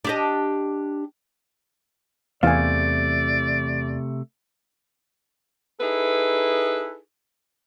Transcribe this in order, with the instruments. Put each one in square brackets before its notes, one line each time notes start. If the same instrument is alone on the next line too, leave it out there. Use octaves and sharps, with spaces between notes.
[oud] D4 G4 D#5
[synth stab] E2 [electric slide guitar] C3 A3 [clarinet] D5 [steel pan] F5 G#5
[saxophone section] D#4 E4 G#4 A4 B4